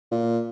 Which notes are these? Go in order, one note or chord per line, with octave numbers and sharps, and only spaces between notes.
A#2